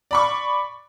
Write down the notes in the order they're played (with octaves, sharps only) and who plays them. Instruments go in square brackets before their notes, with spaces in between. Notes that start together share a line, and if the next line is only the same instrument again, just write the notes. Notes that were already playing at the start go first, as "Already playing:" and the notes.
[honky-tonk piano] D5 B5 C#6